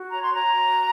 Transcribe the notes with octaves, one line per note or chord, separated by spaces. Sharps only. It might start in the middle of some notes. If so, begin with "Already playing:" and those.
Already playing: F#4
C#5 A#5
C6
C#5 A#5
F#4